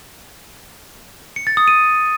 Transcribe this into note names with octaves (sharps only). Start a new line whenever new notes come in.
C#7
A6
D#6
D#7